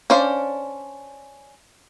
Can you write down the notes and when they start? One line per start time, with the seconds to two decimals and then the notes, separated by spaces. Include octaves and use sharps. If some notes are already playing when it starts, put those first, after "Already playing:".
0.10 C#4 D4 C5 D5 F5